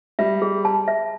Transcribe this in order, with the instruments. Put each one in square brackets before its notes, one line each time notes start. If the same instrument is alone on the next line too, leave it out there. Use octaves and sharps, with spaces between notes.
[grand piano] G3 [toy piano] E5
[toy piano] G#4
A5
E5